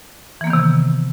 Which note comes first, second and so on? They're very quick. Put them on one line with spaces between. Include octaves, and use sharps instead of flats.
E3 A#3 B3 D#3 C3